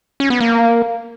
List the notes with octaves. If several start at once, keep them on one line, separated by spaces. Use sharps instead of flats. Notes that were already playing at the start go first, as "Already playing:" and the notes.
C#4
B3
A#3